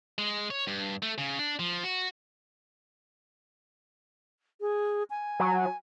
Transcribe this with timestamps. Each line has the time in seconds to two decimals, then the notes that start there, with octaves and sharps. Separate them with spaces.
0.18 G#3
0.50 C#5
0.67 G2
1.02 A3
1.18 C#3
1.39 D4
1.59 F3
1.84 F#4
4.61 G#4
5.10 G#5
5.40 F#3